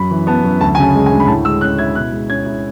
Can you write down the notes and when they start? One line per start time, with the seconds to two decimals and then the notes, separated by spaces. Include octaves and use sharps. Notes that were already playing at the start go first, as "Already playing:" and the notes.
Already playing: F#2 B5
0.11 E3
0.27 B3 A5
0.44 F#2
0.61 D2 A5
0.75 G#5
0.78 C#3 A5
0.94 G#3
1.06 G#5
1.11 D2
1.20 B5
1.27 A2 A5
1.45 G#3 E6
1.61 C#4 F#6
1.78 E4 G#6
1.95 B2 F#6
2.12 G#3
2.29 C#4 G#6
2.46 E4